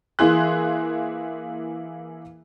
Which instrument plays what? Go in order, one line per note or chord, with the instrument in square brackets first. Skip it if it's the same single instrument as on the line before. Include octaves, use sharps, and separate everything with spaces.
[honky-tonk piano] E3 A#3 E4 G#4 C6 F#6